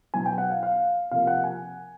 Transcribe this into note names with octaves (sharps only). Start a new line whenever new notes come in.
B2 F#3 B3 E4 G#5
G5
F#5
F5
F5
C3 F3 A#3 F5
F#5
G#5